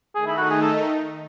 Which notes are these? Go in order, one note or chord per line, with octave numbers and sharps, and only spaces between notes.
D#3 A3 D#4 G#4
E4
F#4
G#4
A4